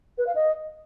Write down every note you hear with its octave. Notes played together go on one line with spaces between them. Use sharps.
B4
F5
D#5